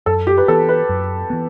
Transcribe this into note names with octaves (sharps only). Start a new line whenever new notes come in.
F#2 A4
G4
B4
E3 B3 A4
B4
F#2
E3 B3